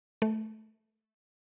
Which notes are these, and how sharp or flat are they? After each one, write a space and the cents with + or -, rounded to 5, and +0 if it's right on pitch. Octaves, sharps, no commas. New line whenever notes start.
A3 -10